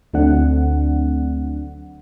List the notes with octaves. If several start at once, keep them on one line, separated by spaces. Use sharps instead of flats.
D2 F#3 A3 C4 D4 F#5